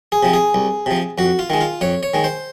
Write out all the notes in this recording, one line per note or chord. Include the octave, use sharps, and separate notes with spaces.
G#4
C3 F3
G#4
C2
C3 F3
F2 F#4
F4
D#3 G#3
F4
F2 C#5
C#5
D#3 G#3
C5